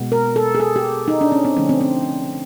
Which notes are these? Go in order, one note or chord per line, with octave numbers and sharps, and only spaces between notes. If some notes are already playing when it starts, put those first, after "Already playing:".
Already playing: B2 G#3 B3
A#4
A4
G#4
A4
G4
D#4
D4
C#4
C4
D3 F3 A3 C#4
C4
C4